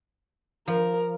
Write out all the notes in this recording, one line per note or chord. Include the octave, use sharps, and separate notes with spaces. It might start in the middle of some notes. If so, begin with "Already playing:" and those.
F3 A#4